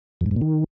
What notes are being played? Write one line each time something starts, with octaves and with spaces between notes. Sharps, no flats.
F2
G#2
G2
A#2
D#3